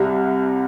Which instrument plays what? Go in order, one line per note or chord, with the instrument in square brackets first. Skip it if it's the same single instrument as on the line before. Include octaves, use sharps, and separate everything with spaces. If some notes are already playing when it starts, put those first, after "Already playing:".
Already playing: [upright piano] C2 C3 G3